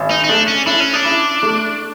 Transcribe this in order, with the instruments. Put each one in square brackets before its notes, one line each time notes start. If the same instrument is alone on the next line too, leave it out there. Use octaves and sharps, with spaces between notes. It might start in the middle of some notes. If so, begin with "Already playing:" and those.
Already playing: [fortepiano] G#1
[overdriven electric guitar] D#4
D#4
[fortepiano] A3 [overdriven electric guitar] D4
[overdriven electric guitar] C#4
[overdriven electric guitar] D4 [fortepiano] E4
[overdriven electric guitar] C#4
D4
[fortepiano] E4
A3